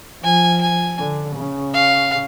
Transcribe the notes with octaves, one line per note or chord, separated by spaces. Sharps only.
F3 G#5
G#5
D3
C#3
F5